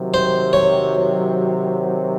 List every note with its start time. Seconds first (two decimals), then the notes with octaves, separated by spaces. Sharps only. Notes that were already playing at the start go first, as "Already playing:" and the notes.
Already playing: C3 D#3 F#3
0.14 C5
0.53 C#5